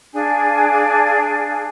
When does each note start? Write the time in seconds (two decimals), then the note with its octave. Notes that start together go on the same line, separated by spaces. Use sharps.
0.13 D4 G#4 F5 G#5